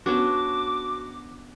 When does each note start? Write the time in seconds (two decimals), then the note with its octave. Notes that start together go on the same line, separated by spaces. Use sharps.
0.06 B3 C#4 D4 F#4 D6